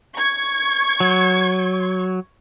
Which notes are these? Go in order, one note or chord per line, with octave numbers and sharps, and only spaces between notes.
C#6 G#6
F#3